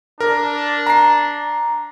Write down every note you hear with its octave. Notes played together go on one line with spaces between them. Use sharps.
D4 A#4
A#5 C7